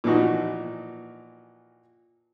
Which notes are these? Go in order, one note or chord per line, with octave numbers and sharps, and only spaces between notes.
A#2 E3 F3 D#4 F#4